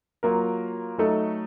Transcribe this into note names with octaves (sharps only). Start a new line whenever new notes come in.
F#3 A#3 F4 A#4
F#3 A3 D#4 A4